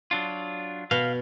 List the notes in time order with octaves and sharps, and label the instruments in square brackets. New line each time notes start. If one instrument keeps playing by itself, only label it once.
[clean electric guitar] F#3 D4 F4
[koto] B2 [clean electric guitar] F5